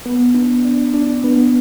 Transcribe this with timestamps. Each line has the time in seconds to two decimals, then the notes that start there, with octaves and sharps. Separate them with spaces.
0.05 B3
0.34 D4
0.65 D4
0.94 D4
1.24 B3